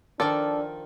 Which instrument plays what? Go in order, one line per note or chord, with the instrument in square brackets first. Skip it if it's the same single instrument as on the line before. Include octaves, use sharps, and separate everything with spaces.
[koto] D#3 F3 [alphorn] D4 [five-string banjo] A4 D5